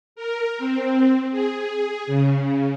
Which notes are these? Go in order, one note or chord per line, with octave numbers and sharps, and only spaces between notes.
A#4
C4
G#4
C#3